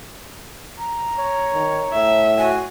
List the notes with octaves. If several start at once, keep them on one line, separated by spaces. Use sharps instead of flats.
A#5
C#5
D#3
A2 E5
F#4 G#5